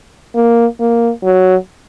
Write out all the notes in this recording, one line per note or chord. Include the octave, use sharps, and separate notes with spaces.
A#3
A#3
F#3